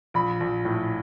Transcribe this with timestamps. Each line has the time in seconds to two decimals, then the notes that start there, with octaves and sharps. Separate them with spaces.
0.14 A#1 B5
0.40 A#1
0.65 A2